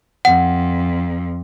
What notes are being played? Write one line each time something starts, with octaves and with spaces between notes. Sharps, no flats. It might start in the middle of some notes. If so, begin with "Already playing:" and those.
F2 F#5